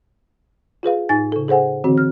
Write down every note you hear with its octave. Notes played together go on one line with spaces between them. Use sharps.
F4 G#4 B4 F5
A2 D#4 G#5 A6
C#3 A4
G#4 A4 C5 F#5 G#5
D3 E3 C4 F#4
F6